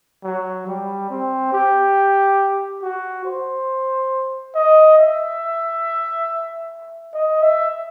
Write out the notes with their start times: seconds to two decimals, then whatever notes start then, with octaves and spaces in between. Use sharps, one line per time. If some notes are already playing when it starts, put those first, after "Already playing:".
0.24 F#3
0.67 G3
1.10 C4
1.53 G4
2.82 F#4
3.25 C5
4.55 D#5
4.98 E5
7.14 D#5
7.42 E5